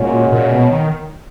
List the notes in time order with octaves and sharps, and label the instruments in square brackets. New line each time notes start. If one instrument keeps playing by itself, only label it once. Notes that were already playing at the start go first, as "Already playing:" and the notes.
Already playing: [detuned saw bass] A#2 [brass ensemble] G#3 C#4 F#4 C#5
[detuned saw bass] A#2
B2
D#3